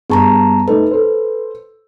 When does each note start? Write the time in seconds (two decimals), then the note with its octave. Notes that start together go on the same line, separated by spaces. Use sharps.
0.10 G2 B3 G#4 A5 A#5 C#6
0.68 A3 D#4 A4 B4
0.91 A4 C5